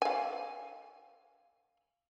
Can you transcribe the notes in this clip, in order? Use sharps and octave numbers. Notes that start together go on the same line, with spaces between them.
F5 G#5